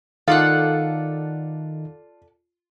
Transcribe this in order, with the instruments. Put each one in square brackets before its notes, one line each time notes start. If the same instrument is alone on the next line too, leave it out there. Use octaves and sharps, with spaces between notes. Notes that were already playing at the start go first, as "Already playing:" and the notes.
[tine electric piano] D#3 D#4 [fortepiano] F4 [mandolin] A4 D5 F#5 [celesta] F5